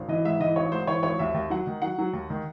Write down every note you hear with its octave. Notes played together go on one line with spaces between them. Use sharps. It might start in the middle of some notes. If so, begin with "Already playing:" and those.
Already playing: G#1
E3 D#5
G#2 E5
E3 D#5
G#1 C#5
G#2 C5
E3 C#5
G#1 C#5
D#2 E5
D#2
F#3 F#5
D#3
F#3 F#5
F#3
D#2
D#3